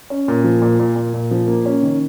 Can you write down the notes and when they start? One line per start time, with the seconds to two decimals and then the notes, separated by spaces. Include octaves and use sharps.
0.10 C#4
0.28 A#2
0.44 F3
0.62 A#2
0.79 A#2
0.96 A#2
1.14 A#2
1.31 F3
1.47 A#3
1.66 C#4
1.83 D#3